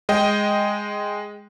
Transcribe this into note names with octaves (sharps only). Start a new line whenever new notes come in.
G#3 D#5 G5